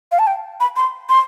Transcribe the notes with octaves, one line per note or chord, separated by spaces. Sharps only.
F5
A5
G5
B5
C6
C6